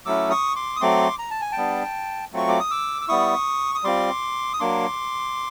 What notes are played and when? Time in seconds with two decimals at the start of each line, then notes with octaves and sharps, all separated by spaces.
0.06 F#3 A3 C#4 E4 D6 E6
0.30 C#6 D#6
0.56 C6 D6
0.76 D#6
0.81 F#3 A3 C4 C6 D6
1.19 A#5
1.30 A5
1.41 G#5
1.52 G5 A5
1.57 G3 B3 D4
2.33 F#3 A3 C4 F4 C#6
2.49 D6
2.60 D#6
2.71 D6 E6
3.01 E6
3.08 G3 B3 E4 C#6 D#6
3.75 D#6
3.84 G3 C4 F4 C6 D6
4.54 D#6
4.60 F#3 A#3 D4 C6 D6